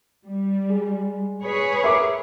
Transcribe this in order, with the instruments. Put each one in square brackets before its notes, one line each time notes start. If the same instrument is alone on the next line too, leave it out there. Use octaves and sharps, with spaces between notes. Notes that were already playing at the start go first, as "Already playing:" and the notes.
[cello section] G3
[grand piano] G#3
[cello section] G#4 B4 C#5
[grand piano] A#4 E5 D6